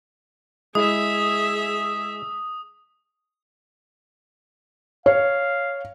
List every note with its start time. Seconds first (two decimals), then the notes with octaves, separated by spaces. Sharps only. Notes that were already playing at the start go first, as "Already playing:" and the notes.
0.75 G#3 E4 G#4 E5 D#6
5.06 C#5 F5